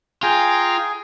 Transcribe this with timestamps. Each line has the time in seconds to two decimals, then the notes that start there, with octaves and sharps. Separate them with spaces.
0.23 F4 G#4 G5 G#5 A#5